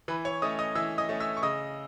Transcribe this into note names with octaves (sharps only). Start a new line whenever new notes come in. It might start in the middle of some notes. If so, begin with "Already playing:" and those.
E3 B4 B5
C#5 C#6
A3 C#4 D#5 D#6
D#5 D#6
E3 E5 E6
D#5 D#6
A3 C#4
E5 E6
C#6
C#3 D#5 D#6